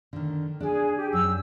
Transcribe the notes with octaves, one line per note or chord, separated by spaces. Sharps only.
D3 D#3
D4 G#4 D5
G4
F#2 E6